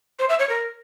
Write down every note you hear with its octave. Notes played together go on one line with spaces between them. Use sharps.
C5
E5
C#5
A#4